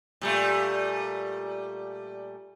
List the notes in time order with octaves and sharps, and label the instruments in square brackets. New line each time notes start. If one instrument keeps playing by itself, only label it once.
[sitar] A#2 G3 A3